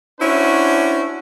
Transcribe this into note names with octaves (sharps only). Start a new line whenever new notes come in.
C#4 D4 E4 F#4 C5